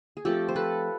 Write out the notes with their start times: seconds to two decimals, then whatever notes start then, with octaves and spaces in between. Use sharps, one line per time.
0.17 G#4
0.25 F3 A3 C4 G4 A4
0.48 C5
0.56 A4 B4